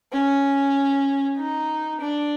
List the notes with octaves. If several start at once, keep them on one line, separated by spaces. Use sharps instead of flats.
C#4
D#4
D4